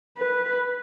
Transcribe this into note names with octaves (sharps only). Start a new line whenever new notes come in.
B4